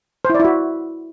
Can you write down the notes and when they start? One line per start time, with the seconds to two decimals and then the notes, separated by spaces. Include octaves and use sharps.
0.25 C5
0.30 E4
0.35 D5
0.40 E4
0.45 F#4